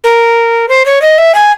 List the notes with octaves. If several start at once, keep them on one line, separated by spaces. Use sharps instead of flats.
A#4
C5
C#5
D#5
E5
G#5